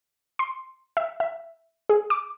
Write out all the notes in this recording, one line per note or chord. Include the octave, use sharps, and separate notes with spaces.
C6
E5
E5
G#4
D6